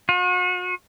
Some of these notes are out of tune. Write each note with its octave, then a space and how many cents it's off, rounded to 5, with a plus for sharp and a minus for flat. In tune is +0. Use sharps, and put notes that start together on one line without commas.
F#4 -40